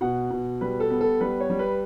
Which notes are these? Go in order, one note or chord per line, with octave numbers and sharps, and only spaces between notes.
B2 F#5
B2
G3 B4
A4
B3
A4
G3 B4
C#5
G3
B4